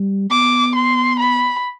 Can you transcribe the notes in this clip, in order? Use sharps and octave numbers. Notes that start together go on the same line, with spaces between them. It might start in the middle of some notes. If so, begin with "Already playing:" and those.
Already playing: G3
B3 D6
C6
B5